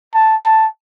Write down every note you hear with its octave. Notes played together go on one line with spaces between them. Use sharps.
A5
A5